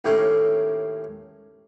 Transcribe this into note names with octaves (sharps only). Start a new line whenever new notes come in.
D#2 A2 A3 A#3 C#4 C6